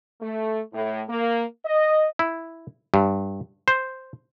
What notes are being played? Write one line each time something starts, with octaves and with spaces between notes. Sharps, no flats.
A3
A2
A#3
D#5
E4
G2
C5